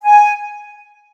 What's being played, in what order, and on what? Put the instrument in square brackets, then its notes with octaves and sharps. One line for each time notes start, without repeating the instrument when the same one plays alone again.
[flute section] G#5